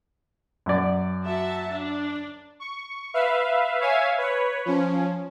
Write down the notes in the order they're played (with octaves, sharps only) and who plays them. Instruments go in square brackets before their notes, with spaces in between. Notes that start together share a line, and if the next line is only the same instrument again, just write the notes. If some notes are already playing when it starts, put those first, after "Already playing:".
[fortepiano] F#2 D5
[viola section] F#4 E5 A5
D4
[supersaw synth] C#6
B4 E5 F5
C#5 E5 F5 G#5
B4 C#5
F3 C#4